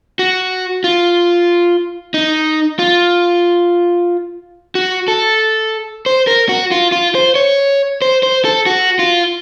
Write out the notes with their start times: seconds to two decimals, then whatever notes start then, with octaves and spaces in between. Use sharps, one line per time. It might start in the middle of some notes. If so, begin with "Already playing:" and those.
0.19 F#4
0.84 F4
2.14 D#4
2.79 F4
4.75 F#4
5.08 A4
6.06 C5
6.27 A#4
6.49 F#4
6.71 F4
6.92 F4
7.15 C5
7.35 C#5
8.02 C5
8.23 C5
8.45 A4
8.66 F#4
8.99 F4